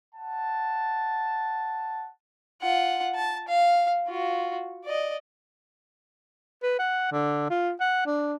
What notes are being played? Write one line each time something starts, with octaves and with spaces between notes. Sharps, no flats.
F#5 A5
F4 F#5
A5
F5
F4 F#4
D5 D#5
B4
F#5
D3
F4
F#5
D4